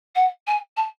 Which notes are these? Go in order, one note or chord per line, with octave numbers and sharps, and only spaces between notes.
F#5
G#5
A5